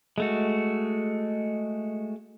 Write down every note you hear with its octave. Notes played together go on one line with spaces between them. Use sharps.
G#3 A3 F#4